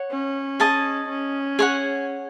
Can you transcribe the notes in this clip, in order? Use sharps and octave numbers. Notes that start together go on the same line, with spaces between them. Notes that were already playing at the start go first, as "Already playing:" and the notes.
Already playing: C#5 F#5
C#4
G#4 D#5 A5
C#4
G#4 C#5 F#5